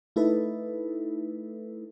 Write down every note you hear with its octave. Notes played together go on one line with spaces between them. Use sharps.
A3 D#4 E4 A4 B4